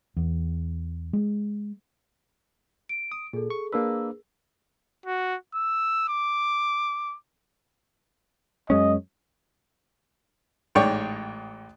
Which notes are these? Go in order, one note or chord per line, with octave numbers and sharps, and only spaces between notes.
E2
G#3
D7
D#6
A#2 G#4 A4
C#6
A#3 D4 G#4 A#4 B4 E6
F#4
E6
D6
F#2 G#3 C#4 D#5
A1 G#2 C#5 D5 G5 C#6